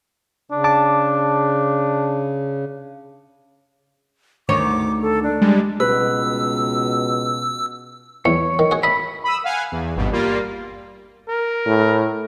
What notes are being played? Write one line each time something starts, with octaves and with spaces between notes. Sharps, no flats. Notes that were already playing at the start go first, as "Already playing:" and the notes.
C#3 D4
A5 D6
D2 D#3 C#5 D6
A4
D4
G3 G#3
C#2 B2 B4 E6
E2 C#5
D#3
F#4 G#4
D#5 E5 B5
B5 D#6 E6
F5 F#5 G#5
E2
G#1 G2 B2
G3 A#3 F4
A#4
A2